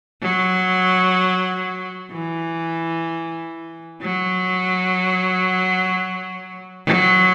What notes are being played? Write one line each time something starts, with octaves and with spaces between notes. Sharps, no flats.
F#3
E3
F#3
F#3